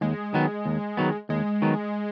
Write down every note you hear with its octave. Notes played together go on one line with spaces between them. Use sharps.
D#2 G#3
D#3 F#3 B3
D#2
D#3 F#3 B3
D#2 G#3
D#3 F#3 B3